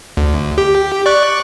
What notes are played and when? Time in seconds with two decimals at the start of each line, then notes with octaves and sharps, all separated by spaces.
0.17 D2
0.58 G4
1.06 D5 C#6 F#6